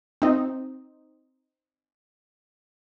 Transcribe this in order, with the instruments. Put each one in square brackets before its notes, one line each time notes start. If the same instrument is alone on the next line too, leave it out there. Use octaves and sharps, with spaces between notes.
[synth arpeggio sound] C4 D#4